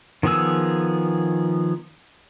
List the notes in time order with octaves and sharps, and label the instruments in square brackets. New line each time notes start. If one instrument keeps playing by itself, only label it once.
[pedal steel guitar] D#3 F3 B3 G#4 E6